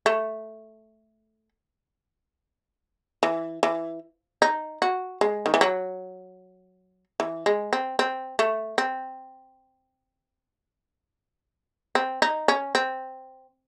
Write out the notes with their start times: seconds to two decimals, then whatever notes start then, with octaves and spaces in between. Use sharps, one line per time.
0.06 A3
3.23 E3
3.63 E3
4.42 D#4
4.82 F#4
5.21 G#3
5.46 D#3
5.54 E3
5.61 F#3
7.20 E3
7.46 G#3
7.73 C4
7.99 C4
8.39 A3
8.78 C4
11.95 C4
12.22 D#4
12.48 C#4
12.75 C4